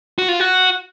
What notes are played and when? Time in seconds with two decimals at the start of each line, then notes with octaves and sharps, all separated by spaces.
0.18 F#4
0.29 F4
0.40 F#4